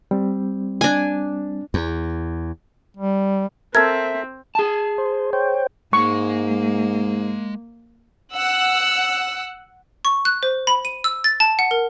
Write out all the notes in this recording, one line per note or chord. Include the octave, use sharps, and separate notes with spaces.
G3 C4
D4 G#5
E2
G3
C4 A4 A#4 E5 G#6
G#4 A5
C5
C5 C#5 G5
G#2 G#3 A#3 C#6
F#5 E6
C#6
F#6
C5
B5
D#7
E6
A6
A5
F#5
A#4